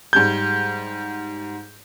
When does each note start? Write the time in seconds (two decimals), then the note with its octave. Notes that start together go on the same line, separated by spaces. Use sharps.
0.13 G#2 G3 G6 G#6